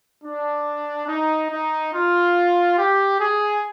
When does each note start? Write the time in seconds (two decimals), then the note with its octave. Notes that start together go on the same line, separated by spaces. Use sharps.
0.23 D4
1.08 D#4
1.50 D#4
1.93 F4
2.78 G4
3.20 G#4